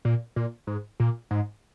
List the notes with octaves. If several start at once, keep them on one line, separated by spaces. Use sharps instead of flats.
A#2
A#2
G#2
A#2
G#2